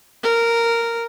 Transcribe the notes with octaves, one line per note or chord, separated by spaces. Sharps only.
A#4